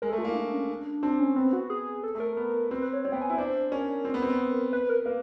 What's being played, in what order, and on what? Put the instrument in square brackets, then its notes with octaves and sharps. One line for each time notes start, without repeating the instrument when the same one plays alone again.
[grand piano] G#3 [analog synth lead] A#4
[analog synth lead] A4
[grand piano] A3
[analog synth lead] F4
[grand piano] A#3 [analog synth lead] E4
[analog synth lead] D4
C#4
D4
[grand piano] C4 [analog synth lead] D4
[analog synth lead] C#4
[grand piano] B3 [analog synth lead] C4
[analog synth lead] F#4
G#4
A4
[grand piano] A3
[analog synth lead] A#4
[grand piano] B3
[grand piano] C4 [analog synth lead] B4
[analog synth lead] B4
C#5
[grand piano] C4 [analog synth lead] C#5
[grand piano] B3 [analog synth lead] G5
[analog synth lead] G#5
[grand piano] E4
[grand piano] D4 [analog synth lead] C5
[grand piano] C#4 [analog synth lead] A#4
[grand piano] C4
B3
C4
B3
[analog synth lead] B4
A#4
[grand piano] A#3 [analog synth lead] B4